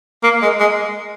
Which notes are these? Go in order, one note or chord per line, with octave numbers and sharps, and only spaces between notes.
A#3
G#3
G#3